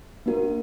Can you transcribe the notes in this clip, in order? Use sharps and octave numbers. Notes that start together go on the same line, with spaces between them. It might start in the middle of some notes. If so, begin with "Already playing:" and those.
A#3 D4 F#4 A#4